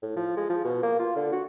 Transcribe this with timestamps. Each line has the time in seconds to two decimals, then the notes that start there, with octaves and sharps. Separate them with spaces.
0.03 A2
0.17 F3
0.37 G#3
0.50 F3
0.65 B2
0.83 A#3
0.99 F4
1.16 D3
1.32 F#4